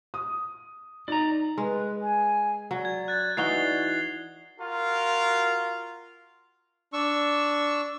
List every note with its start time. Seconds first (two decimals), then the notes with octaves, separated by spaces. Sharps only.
0.14 D#6
1.08 D#4 D5 A#5
1.58 G#3 B4
2.01 G#5
2.71 F#3 D5
2.85 G#6
3.08 F#6 A6
3.37 E3 D#4 F#4 C7 F7 G7
4.60 F4 F#4 A#4
6.93 D4 C#6 E6